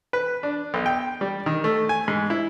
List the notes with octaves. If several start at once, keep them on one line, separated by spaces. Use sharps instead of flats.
B4
D4
B1
G5
G3
D#3
A3
G#5
G#2
E4